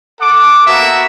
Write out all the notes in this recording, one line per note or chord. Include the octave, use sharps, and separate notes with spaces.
A4 F#5 D6
A#3 B3 F#4 A4 E5